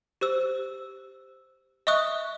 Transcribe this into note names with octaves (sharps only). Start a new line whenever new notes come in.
G4 C5 E6
D#5 E5 C#6 D#6 F#6